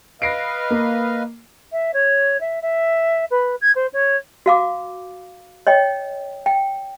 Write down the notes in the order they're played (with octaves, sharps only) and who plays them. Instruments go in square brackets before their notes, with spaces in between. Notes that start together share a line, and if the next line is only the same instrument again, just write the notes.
[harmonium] B4 D#5 F5 [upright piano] A#6 C7 D7
[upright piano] A#3
[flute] E5
C#5
E5
E5
B4
G#6
C5
C#5
[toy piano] F#4 F5 D6
C#5 D#5 G5
G5